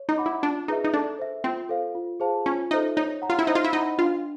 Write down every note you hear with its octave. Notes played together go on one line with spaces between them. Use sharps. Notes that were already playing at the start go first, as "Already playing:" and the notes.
Already playing: C#5
D#4
F#5 B5 D6
E4
D4 F4
D#4 G#4 B4 E5
D#4
D4 A4
C5 E5
C4 F4
A4 C5 F5
F4
G#4 C5 F5 A5
C#4 F4
D#4 A4 C5 E5
D#4 C#5
F#5 A#5
F4
E4
D#4 C5
F4
E4
D#4 D#5 F#5 B5
D4 F4